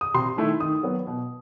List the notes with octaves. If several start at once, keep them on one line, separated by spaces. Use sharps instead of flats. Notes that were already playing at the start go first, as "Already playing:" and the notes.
D#6
C3 C6
D#3 A3 E4
D#3 D#6
F#3 B3
B2